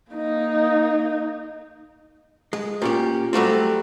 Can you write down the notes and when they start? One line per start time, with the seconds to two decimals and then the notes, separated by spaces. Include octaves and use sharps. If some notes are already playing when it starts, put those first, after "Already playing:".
0.11 A#3 D#4
2.53 G#3
2.82 A#2 C#4 G4
3.33 F#3 G3 A3 C4